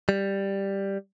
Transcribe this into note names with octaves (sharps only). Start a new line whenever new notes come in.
G3